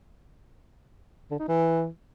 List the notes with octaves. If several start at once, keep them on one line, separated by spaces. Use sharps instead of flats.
D3
D#4
E3